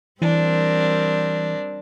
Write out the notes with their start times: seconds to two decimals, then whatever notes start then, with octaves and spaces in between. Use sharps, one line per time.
0.22 E3 G3 C4 D4 A#4